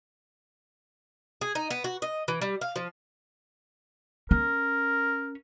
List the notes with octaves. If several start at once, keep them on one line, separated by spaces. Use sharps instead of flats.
G#4
D#4
B3
F#4
D#5
E3
G3
F5
F3
C#4 A#4